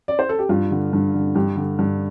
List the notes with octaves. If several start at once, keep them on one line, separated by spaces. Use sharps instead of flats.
D5
C5
A4
G4
G2 F4
D3
G2
D3
G2 G4
D3
G2